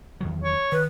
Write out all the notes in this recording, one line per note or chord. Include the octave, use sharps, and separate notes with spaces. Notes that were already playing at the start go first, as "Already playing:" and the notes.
E2 D#3 F#3
C#5
D#3 B4